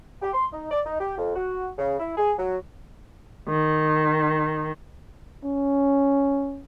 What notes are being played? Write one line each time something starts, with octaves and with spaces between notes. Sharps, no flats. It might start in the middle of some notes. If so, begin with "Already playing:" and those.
G4
C6
D#4
D5
D#4
G4
F2
F#4
C#3
E4
G#4
F#3
D#3
C#4